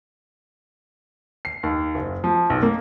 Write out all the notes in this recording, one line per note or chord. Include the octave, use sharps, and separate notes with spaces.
C7
D#2
F#1
F3
B1
A#3